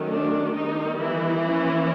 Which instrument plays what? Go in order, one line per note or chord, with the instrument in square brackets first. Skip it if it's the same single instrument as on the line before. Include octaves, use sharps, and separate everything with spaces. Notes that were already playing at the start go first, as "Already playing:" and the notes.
Already playing: [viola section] D#3 F#3 A3 C#4
D4
D#3 G3 B3 D#4
E3 E4
F3 A#3 C#4